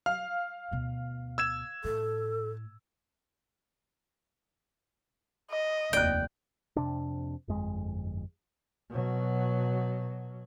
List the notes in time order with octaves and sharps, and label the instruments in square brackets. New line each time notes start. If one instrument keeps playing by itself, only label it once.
[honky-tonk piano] F5 [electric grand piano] F6
[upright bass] D2 B2
[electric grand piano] E6 G#6 E7
[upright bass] A2 [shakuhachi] A4
[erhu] D#5
[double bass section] F1 D#2 [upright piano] D5 F#6 [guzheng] G5
[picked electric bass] F2 C3 D4
G1 F2 G#3
[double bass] B2 F#3